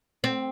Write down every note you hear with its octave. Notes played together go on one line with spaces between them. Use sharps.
C4